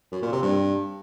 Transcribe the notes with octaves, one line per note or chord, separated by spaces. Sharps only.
F#2
A#2
C3
G2